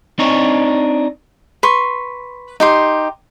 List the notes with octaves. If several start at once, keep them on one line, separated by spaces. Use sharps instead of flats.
C4 D4 D#4 C#5
B4 C6 C#6
D#4 G4 C6